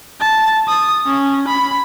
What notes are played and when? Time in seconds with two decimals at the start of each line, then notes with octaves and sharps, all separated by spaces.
0.20 A5
0.67 D#6
1.06 C#4
1.48 B5